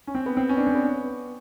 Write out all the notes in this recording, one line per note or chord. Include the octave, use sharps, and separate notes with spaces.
C#4
C4
B3
C4
C#4
D4
C4
B3